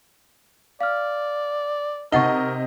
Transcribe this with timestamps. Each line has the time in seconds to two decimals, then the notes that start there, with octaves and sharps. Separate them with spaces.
0.81 D5 F5 F6
2.12 C3 D#4 A#4 D#5 F#5 C#6 A6 G7